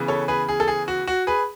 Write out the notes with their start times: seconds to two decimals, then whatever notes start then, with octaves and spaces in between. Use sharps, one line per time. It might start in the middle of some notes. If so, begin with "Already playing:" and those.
Already playing: C#3 E3 B3
0.08 A4 C#5
0.28 G#4 B4
0.48 G#4
0.60 A4
0.68 G#4
0.88 F#4
1.08 F#4
1.27 G#4 B4